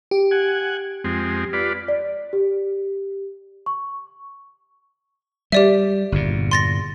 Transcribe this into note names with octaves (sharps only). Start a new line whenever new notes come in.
G4
F#5 G#5
F2 G#3 C4
F4 B4 D5
D5
G4
C#6
G3 G4 D5 E5
G1 E2 A#2
C6 A6 A#6